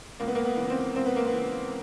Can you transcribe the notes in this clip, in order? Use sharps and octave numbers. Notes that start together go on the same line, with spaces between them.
C#2 A#3
B3
A#3
B3
C#3 E3
C4
C#2 C4
B3
A#3
B3
C#3 E3